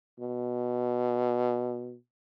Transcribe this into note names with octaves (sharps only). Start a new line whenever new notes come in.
B2